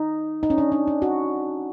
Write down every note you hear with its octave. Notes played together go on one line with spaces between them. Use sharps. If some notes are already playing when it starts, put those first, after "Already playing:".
Already playing: D#4
D#4
C#4
D4
D4
D4
F#4